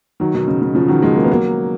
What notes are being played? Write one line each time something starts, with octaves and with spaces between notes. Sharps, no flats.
D#3 F#3
B2 D#3
C#3
C#3
C#3 F3
D#3 F#3
F3 G#3
A#3
B3
F#3 A#3